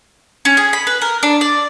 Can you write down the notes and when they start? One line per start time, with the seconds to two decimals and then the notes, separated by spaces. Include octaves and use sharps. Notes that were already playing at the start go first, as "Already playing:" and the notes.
0.45 C#4
0.57 G#4
0.73 B5
0.87 B4
1.02 A#4
1.23 D4
1.41 D5